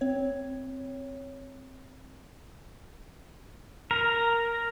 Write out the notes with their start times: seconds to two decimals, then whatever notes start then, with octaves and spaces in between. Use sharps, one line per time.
0.01 C4 C#5
3.91 A#4